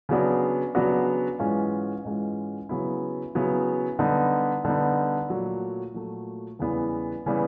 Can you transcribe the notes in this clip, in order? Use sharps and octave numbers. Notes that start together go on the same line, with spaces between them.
C#3 F#3 B3 D4 F#4
C#3 F#3 B3 D4 F#4
G#2 E3 G#3 C#4 F4
G#2 E3 G#3 C#4 F4
C#3 F#3 B3 E4
C#3 F#3 B3 E4
D3 G3 B3 D#4
D3 G3 B3 D#4
A#2 F#3 A3
A#2 F#3 A3
E2 C#3 E3 G3 B3
C#3 E3 G3 B3